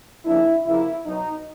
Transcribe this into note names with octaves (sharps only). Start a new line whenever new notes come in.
C#3 F3 A#3 D4 E4
E2 C#3 F3 A#3 E4
B2 F#3 B3 D#4